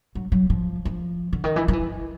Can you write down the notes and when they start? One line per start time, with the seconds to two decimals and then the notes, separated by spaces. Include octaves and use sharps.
0.15 F#3
0.32 F#3
0.50 F3
0.85 F3
1.33 D3
1.44 D#3
1.56 E3
1.68 F3
1.73 E3